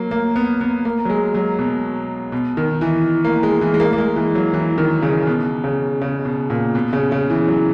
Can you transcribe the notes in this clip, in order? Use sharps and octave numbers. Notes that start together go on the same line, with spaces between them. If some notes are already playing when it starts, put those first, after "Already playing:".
Already playing: F#3 A#3
A#3
B3
B3
A#3
F#3
G#3
F#3
B2
B2
D#3
E3
A#3
G#3
E3
G#3
A#3
A#3
G#3
E3
F#3
E3
D#3
C#3
B2
C#3
C#3
B2
A#2
B2
C#3
C#3
E3
F#3